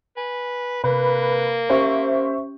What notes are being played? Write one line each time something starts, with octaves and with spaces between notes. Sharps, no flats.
B4 G#5
C3 A#3 B4 B5
C#4 G4 C5 E5 C#6